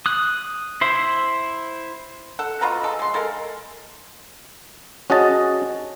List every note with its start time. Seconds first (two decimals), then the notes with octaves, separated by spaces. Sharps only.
0.06 D#6 F#6
0.81 E4 C5 E5
2.39 A4 F#5
2.61 B2 F4 B4 A#5
2.83 G#3 A4
2.99 G#3 C6
3.14 G#3 A4 A#4 F5
5.10 C#4 F#4 G#4 D#5 A5